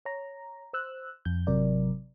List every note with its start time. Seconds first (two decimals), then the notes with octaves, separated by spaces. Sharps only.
0.05 C#5 A#5
0.73 C5 E6 F#6
1.25 F2 G6
1.47 G#1 C3 F#3 A#4 D5